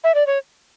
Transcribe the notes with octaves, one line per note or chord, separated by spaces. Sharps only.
E5
D5
C#5